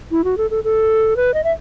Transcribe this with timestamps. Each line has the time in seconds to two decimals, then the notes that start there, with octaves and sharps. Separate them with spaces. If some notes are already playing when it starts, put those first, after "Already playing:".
0.11 E4
0.24 F#4
0.38 A4
0.51 A4
0.64 A4
1.17 B4
1.34 D#5
1.44 E5